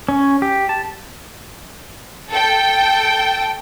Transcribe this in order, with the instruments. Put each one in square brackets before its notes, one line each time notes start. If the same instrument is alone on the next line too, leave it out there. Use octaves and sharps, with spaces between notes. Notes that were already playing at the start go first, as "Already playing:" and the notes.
[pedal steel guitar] C#4
G4
A5
[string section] A4 G5